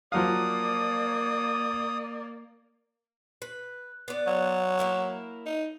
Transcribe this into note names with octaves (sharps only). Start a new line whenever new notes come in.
F3 F#3 A#3 D5 F5 D#6
B4
B3 D5
F#3
A#3 E4 A#4
D#4